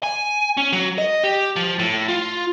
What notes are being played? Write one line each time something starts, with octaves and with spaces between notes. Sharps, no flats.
G#5
C#4
F#3
D#5
G4
F3
A2
F4